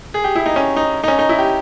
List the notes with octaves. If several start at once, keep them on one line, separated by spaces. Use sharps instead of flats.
G#4
G4
E4
D#4
C#4
D#4
D#4
C#4
D#4
E4
G4